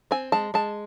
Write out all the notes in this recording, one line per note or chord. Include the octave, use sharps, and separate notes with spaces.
C4 G#5
G#3 A5
G#3 A5